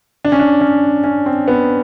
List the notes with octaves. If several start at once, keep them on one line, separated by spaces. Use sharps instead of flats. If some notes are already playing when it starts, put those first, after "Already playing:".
D4
C#4
D4
C#4
C#4
C4
B3